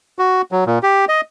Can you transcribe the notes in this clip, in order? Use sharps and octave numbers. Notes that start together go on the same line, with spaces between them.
F#4
F#3
A#2
G4
D#5